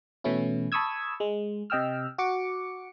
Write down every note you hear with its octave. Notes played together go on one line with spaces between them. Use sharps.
B2 E3 A3 C#4 E4
A5 B5 C#6 D#6 E6 G#6
G#3
C3 D#5 G5 E6 F6
F#4 D6 C#7